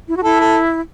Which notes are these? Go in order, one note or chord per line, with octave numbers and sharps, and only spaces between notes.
E4
F#4
E4 A4
A4